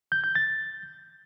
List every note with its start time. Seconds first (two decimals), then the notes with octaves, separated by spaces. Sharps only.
0.12 G6
0.24 G6
0.35 A6